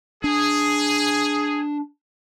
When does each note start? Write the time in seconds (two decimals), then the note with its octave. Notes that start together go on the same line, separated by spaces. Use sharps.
0.24 D4 G#4